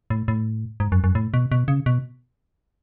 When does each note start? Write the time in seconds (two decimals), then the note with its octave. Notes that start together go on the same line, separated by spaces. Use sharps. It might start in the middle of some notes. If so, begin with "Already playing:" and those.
0.10 A2
0.28 A2
0.80 G#2
0.92 F#2
1.04 F#2
1.15 A2
1.34 B2
1.51 B2
1.68 C#3
1.86 B2